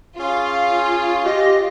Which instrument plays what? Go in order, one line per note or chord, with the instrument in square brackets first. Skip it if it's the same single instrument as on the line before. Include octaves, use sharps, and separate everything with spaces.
[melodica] C#4 G#4 [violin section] F4
[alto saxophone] G4 [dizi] D#5